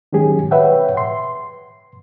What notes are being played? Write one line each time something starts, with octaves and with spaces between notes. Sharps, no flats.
D#3 F#3 G#3 C#4 G4 G#4
B4 C#5 E5 F#5 G5
C6